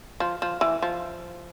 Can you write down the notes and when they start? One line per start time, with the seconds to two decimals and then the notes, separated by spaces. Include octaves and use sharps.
0.20 F3
0.42 F3
0.61 E3
0.82 F3